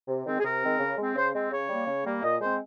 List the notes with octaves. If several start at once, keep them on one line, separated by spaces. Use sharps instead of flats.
C3
D#3 G#3 C4
G#4
C3 A#4
D#3 G#3 C4
C#3
G#3 C4
C#3 C5
G#3 C4
C#3 C#5
G3 A#3
C#3
G3 A#3
A#2 D#5
G#3 C4 C5